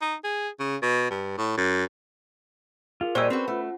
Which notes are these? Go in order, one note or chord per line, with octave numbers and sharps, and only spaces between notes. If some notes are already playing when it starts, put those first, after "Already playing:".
D#4
G#4
C#3
B2
G2
A2
F#2
F4 G#4 A#4
A#2 G3 C5 C#5 D#5 G5 G#5 E6
C4 C#4 F#4 B4
A3 F4 F#5